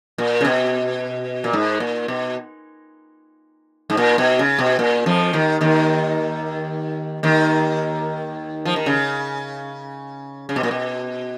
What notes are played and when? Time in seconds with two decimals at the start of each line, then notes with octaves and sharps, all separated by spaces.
0.18 A#2
0.41 C#3
0.45 B2
1.44 A#2
1.53 G#2
1.80 A#2
2.08 B2
3.90 G#2
3.97 A#2
4.18 B2
4.39 C#3
4.58 B2
4.79 A#2
5.06 F2 F3
5.33 D#2 D#3
5.61 D#2 D#3
7.23 D#2 D#3
8.66 F3
8.76 D#3
8.86 C#3
10.49 C#3
10.56 B2
10.63 A#2
10.71 B2